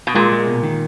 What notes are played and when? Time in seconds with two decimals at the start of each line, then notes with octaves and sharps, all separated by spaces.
0.07 B2
0.15 A#2 G#3
0.32 G#3
0.47 B2
0.63 D#3